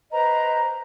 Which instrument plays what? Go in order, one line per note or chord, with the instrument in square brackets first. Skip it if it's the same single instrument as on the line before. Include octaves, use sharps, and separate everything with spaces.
[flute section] B4 C5 D#5 A#5